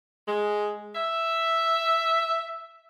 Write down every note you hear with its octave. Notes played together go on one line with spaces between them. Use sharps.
G#3
E5